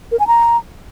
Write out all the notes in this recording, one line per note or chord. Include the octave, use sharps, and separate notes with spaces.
A#4
G#5
A#5